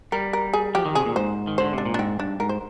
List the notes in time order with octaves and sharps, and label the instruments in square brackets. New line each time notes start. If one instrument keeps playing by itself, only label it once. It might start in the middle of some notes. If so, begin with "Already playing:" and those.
[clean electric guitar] G3 [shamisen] A#4
[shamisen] A#4
G#4
[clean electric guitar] F3 [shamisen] G4
[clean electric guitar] D#3
[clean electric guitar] C3 [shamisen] G#4
[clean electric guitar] A#2
[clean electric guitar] G#2 [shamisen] C5
[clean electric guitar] D#3
[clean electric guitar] D3 [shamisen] C5
[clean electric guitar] C3 [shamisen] D4
[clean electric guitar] A#2
[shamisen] D4
[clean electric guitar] G#2 [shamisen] C4
[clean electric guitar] G2 [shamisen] D4
[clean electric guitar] G#2 [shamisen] A#4
[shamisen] C5